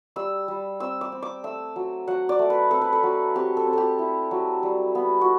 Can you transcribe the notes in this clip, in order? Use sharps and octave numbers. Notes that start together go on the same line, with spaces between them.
G3 E6
G3
C4 E6
D6
C4
D6
A3 E6
F#3
F#3 F#5
D5
A3
B4
C4 A4
B4
A4
F#3
C4 G4
A4
C4
G4 A4
E4
F#3
G3
B3
F#4